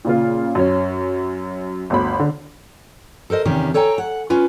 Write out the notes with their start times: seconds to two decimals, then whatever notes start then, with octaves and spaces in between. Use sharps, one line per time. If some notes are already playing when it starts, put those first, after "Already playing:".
0.05 A#2 C#3 F4
0.55 F#2 C#4
1.90 G1 D2 B5
2.19 D3
3.30 A4 A#4 C5 D#5
3.45 E2 C3 D#3 C#4 G4
3.74 A4 C#5 G5 G#5 A#5
3.98 F#5
4.30 C#4 F4 B4